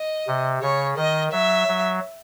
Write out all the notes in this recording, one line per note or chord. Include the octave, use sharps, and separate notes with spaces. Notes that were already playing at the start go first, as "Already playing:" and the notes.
Already playing: D#5
C3
C#3 C#5
D#3 D#5
F#3 E5
F#3